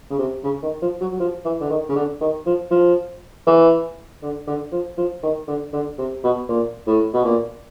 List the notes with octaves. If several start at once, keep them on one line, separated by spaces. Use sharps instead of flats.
C#3
C3
C#3
D#3
F3
F#3
F#3
F3
E3
D3
D#3
C#3
D3
D#3
F3
F3
E3
D3
D3
F3
F3
D#3
D3
D3
C3
B2
A#2
A2
B2
A#2